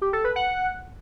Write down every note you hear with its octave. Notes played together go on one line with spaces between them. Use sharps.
G4
A4
B4
F#5